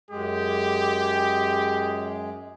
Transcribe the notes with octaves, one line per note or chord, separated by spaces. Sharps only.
F#2 G#3 G4 G#4